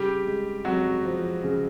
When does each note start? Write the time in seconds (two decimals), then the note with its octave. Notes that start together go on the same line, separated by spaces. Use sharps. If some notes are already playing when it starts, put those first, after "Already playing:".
Already playing: C#3 G3 G4
0.26 G#3
0.65 F2 F#3 F#4
1.05 F3
1.43 C#3